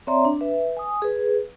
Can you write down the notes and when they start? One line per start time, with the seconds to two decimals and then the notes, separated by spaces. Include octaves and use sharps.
0.07 C4 C#5 D5 E5 A#5 C6
0.25 D4
0.41 B4 E5
0.77 G#5 D#6
1.02 G#4 B4